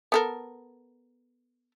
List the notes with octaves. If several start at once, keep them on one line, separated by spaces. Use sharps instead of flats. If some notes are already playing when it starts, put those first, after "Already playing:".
B3 A4 A#4